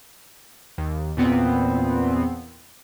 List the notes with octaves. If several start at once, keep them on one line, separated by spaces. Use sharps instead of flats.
D#2
E2 A#2 B3 C4